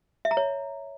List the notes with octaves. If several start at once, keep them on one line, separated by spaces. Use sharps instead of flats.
E5
A#5
C#5